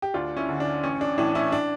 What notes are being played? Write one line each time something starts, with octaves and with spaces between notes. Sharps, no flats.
G4
D2 D4 F4
C#4 E4
D3
D4
A1 C#4
D4
A2 E3 D4
C#4 E4
D4